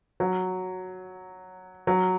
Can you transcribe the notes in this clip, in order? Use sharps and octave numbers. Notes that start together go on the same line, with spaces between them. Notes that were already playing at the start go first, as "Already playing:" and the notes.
F#3
F#3